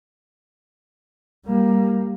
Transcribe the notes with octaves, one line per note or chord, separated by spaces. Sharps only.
G3 A#3